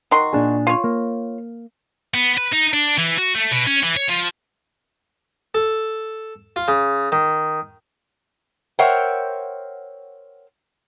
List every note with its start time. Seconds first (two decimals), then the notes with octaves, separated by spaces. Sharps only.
0.11 D#3 F#4 C6
0.33 A#2 D4 G#4
0.67 F4 C#5
0.84 A#3
2.14 B3
2.37 B4
2.52 D#4
2.73 D4
2.98 E3
3.18 F#4
3.35 A3
3.51 B2
3.67 C#4
3.83 E3
3.97 C#5
4.09 F3
5.55 A4
6.56 F4
6.68 C#3
7.12 D#3
8.79 A#4 C5 C#5 E5 F#5 G5